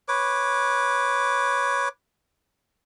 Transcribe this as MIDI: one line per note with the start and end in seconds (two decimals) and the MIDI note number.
0.08 1.89 71
0.08 1.89 73
0.08 1.89 86